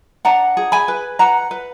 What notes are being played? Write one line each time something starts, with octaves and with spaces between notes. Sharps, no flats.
D4 F#5 A#5
G#4
G#5 B5
B4
B4 F#5 A#5
B4